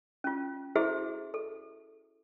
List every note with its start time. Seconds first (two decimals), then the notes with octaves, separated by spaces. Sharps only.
0.24 C#4 F4
0.75 E4 F#4 G#4 A4 C5 E5
1.34 A4